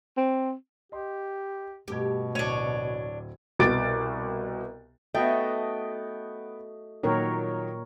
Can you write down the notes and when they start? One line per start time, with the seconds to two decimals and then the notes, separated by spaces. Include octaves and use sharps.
0.17 C4
0.92 G4 D#5 C6
1.88 G2 B2 A3 G4 G#6
2.35 D1 D4 C#5 G#6 D#7
3.59 C2 B2 F#4 D6 A6 D7
5.15 A3 B3 F#4 D#5 G5
7.03 A#2 D#3 F#3 A#4 C#5